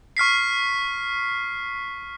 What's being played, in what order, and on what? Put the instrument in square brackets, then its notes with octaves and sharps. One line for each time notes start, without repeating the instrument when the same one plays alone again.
[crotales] C#6 F6 B6 C7